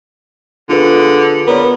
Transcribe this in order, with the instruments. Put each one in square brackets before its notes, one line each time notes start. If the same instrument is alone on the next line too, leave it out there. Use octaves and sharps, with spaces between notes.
[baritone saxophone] D3 [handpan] F4 G#4 B4
[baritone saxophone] B3 [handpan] A#4 C#5 D5